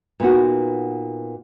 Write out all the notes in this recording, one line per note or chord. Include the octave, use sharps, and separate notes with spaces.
A#2 B3 D#4 F#4